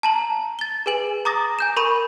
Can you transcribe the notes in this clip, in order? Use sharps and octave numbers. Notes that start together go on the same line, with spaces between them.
A5 A#5 F#7
A6 G7
G#4 B4 G#5 F#7
A#5 D6 D#6 A6 A#6
G#5 G6 E7
A#4 B5 C#6 D#7